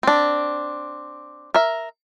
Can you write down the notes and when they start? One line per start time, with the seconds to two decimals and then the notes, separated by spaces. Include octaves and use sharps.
0.03 C4 D4
1.54 A#4 E5